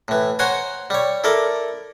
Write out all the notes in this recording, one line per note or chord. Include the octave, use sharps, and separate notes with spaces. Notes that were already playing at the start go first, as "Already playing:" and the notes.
A2 E3
C5 C#5 F#5 G#5 A#5
G3 C#5
E4 A4 A#4 D5